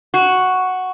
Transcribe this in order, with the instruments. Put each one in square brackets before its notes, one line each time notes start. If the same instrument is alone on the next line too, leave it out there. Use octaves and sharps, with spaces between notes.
[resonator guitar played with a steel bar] F#4